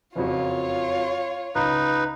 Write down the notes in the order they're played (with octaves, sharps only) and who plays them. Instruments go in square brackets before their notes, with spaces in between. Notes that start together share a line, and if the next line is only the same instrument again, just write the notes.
[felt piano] F#1 F2 F#4 [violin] F4 C#5
[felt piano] C#2 [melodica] D#4 B4